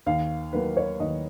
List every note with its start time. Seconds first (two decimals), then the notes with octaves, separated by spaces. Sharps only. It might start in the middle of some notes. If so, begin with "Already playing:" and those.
0.06 D#2 F5
0.53 D#3 F#3 A#3 B4
0.77 C#5
1.00 D#2 D#5